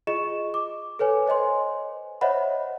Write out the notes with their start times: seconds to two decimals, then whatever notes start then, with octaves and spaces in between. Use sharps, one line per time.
0.07 F4 G#4 D#5 C#6 E7
0.54 D6
0.99 A4 B4 C#5 G#5
1.26 C5 C#5 D#5 G#5 C6
2.21 C5 C#5 D#5 E5 F#5 B5